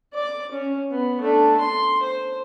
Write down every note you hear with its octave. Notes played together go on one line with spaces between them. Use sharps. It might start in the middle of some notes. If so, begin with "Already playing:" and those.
D5 D6
C#4
B3
A3 D4
C6
C5